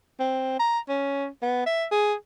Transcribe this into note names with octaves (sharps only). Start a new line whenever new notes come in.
C4
A#5
C#4
B3
E5
G#4